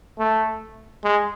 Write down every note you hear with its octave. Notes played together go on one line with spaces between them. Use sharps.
A3
G#3